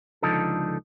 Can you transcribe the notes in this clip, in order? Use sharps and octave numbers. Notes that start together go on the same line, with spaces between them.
C#2 B2 D3 F3 D#4 A4